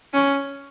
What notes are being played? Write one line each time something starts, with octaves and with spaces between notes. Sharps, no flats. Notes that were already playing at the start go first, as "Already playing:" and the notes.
C#4